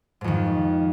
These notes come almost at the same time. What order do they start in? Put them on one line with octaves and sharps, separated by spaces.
G#2 F2 D#3